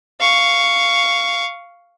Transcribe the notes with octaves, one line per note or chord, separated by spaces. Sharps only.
F5 C#6